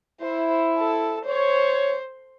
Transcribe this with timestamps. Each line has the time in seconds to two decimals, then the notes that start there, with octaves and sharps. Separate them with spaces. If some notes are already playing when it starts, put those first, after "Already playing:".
0.21 E4 C5
0.77 A4
1.26 C5 C#5